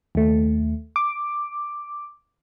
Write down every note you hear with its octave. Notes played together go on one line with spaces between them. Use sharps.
D#2 A3
D6